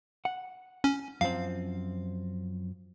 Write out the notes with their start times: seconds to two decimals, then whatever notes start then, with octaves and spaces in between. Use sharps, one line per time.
0.25 F#5
0.84 C#4
1.21 F#2 F3 C4 F5